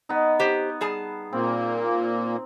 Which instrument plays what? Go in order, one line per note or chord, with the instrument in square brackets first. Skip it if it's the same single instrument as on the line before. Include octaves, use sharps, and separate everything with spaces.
[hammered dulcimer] B3 D#4
[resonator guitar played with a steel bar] G4 C5
G3 G#4 A5
[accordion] A#2 A#3 [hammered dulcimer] C4